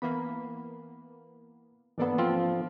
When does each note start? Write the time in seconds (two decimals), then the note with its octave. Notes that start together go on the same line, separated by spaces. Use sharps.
0.02 E3 A#3 B3 B5
1.98 G#2 E3 A#3 B3 D4 A4
2.18 F3 C4 F4